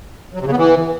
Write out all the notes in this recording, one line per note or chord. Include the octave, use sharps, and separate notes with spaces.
F#3
C3
C#3
B3
E3